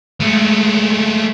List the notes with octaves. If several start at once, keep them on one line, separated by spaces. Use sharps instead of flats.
G#3 A3